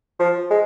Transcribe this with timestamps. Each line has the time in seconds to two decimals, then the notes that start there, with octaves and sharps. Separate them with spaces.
0.19 F3
0.51 G#3